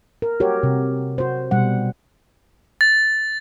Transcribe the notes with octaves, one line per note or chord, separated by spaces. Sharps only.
A#4
F#4 G4 A#4 C#5
C3
F#4 C5
B2 G3 F#5
A6